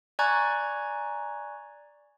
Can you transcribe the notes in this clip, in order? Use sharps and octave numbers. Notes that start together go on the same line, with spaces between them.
D5 G#5 A#5 C#6 F#6 G#6